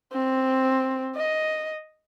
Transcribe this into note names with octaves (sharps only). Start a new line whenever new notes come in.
C4
D#5